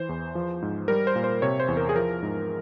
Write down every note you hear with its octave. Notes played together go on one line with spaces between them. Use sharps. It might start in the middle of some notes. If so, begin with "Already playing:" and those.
Already playing: E3 C5
E2
F3
G#2
G3 A#4
C5
A#2
C5
C3 C#5
C5
E2
A#4
G#4
F3 A#4
G#2